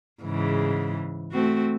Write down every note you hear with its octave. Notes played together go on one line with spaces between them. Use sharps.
G#2 C#3 E3
A3 C4 F#4